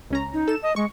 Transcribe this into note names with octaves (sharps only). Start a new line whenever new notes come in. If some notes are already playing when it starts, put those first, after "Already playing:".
C#2 C#4 A#5
D#4
A4 E7
D#5
G#3 C#6